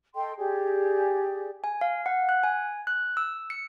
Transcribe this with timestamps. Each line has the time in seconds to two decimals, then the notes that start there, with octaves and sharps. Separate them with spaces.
0.15 A4 D#5 G5 C6
0.37 G4 G#4 D5
1.64 G#5
1.81 F5
2.06 F#5
2.29 F#6
2.44 G#5
2.87 F#6
3.17 E6
3.50 C#7